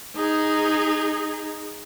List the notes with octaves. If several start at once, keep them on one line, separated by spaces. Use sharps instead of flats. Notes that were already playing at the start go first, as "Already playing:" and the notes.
D#4 G#4